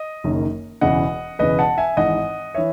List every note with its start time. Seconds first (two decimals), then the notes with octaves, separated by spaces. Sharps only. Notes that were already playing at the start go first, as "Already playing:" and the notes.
Already playing: D#5
0.24 F#1 F#2 D#3
0.81 E1 E2 C#3 E3 D#5 F#5
1.39 E1 E2 C#3 E3 B4 D#5
1.59 F#5 A5
1.78 E5 G#5
1.97 G#1 G#2 E3 D#5 F#5
2.55 E3 C#5 E5